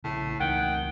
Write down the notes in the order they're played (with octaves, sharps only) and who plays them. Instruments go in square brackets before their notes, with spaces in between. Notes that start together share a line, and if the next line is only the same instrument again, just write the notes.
[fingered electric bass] A#1 C#3 [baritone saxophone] A2
[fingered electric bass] C#2 E3 A3 [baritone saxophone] D#3 [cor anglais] F#5 [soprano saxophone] G5